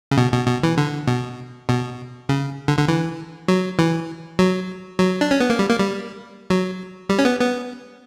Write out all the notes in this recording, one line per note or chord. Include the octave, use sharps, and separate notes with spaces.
C#3
B2
B2
B2
E3
D3
B2
B2
C#3
D3
D3
E3
F#3
E3
F#3
F#3
D4
C#4
B3
A#3
G3
A#3
G3
F#3
G3
C#4
B3
B3